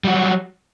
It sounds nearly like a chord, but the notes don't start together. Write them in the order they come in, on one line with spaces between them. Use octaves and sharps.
G3 F#4 F#3